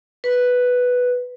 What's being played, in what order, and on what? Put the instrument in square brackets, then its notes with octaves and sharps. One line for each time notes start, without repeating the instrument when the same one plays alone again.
[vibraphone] B4